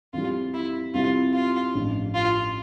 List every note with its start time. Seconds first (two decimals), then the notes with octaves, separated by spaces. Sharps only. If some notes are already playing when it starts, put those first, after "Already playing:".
0.13 F2 E3 G3 F4
0.54 E4
0.94 F2 C3 G3 C4 E4 F4
1.34 F4
1.74 A1 G2 F3
2.14 F4